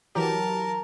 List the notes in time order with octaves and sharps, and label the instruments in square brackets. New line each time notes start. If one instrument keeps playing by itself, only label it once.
[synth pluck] E3 F#3 G4 [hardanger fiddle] A#4 A5 [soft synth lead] A#5